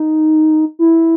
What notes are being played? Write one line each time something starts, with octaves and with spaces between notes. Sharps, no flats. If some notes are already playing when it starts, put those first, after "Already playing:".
Already playing: D#4
E4